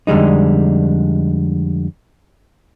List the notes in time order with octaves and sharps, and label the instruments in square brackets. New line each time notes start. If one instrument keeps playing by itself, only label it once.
[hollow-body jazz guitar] F2 D3 G3 G#3 D#4